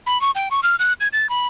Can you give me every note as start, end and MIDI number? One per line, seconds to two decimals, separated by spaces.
0.06 0.20 83
0.21 0.31 85
0.35 0.49 79
0.51 0.60 85
0.63 0.76 89
0.79 0.93 90
1.00 1.08 92
1.13 1.29 93
1.29 1.47 83